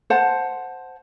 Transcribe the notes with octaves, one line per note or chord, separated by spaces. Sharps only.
C5 F#5 A5